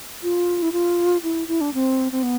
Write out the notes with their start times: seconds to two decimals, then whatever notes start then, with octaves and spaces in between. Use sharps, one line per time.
0.23 F4
0.62 E4
0.72 F4
1.23 E4
1.48 E4
1.61 D4
1.74 C4
2.12 C4
2.23 B3